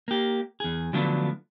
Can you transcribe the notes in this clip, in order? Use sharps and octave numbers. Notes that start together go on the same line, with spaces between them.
A#3 G4
E2 G#4
D3 F3 F#3 A3 B3 D4